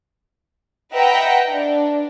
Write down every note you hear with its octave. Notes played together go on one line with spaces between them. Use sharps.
B4 D#5 E5 F#5 G5 A#5
D4